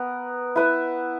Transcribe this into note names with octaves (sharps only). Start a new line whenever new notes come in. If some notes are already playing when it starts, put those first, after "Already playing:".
Already playing: B3 A#4
E4 B4 E5